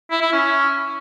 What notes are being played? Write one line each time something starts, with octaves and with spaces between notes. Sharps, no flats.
E4
E4
C#4